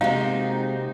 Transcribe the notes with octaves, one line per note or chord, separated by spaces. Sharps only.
C3 G#3 A#3 C4 D#4 F#4 F5